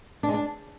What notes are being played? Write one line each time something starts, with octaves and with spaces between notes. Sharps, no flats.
D4
G#3
D4